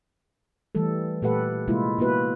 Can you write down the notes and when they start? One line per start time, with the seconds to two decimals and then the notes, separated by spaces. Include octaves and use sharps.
0.75 E3 G3 A3 A4
1.22 A#2 A3 G4 A4 B4 F#5
1.67 C3 G#3 A#3 E4 F4
1.98 A#3 B3 E4 F#4 B4